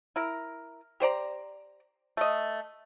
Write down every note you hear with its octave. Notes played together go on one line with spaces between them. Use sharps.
E4 A#4
G4 C5 D5 A#5
A3 D#5